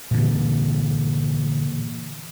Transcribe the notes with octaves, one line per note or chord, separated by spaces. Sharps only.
A#2 D3 E3